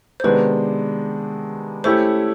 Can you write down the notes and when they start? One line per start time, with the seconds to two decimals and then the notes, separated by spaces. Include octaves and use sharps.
0.20 C5
0.24 C3 D#3 G#3 B3 D4 B4
1.84 A3 C#4 E4 G4 C5